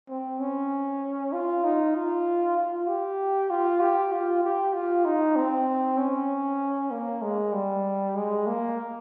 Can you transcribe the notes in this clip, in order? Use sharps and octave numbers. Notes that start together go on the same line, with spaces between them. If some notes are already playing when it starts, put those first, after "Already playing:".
C4
C#4
F4
D#4
F4
F4
G4
F4
G4
F4
G4
F4
D#4
C4
C#4
A#3
G#3
G3
G#3
A#3